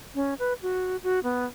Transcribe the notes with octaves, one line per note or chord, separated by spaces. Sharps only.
C#4
B4
F#4
F#4
B3